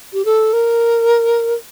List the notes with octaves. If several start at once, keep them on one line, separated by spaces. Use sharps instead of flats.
G4
A4
A#4